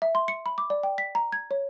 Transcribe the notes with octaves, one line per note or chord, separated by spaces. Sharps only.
E5
C6
C#7
B5
D6
D5
G5
B6
A#5
G#6
C#5